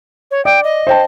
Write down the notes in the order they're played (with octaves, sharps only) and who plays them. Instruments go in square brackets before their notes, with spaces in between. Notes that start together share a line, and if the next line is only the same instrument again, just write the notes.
[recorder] C#5
[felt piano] D5 [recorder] G5
[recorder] D#5
[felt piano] C5 G5 A5